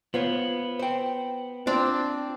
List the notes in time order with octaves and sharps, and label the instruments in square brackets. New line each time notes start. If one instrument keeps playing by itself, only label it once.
[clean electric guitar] B3 [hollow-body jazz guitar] F4 C5 C#5
[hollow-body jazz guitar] C5 G5
[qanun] C4 D4 [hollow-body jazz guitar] F4 D5